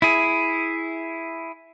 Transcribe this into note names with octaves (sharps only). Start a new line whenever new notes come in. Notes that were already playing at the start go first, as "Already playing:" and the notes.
E4 G#4